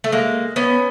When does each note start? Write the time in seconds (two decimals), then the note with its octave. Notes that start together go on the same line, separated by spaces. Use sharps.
0.04 A3
0.12 G#3 A#3
0.56 B3 C#4